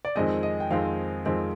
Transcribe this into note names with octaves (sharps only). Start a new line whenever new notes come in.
D5
F2 D#3 G#3 C4 D#5
D#5
G5
F2 D#3 G#3 C4 F5
F2 D#3 G#3 C4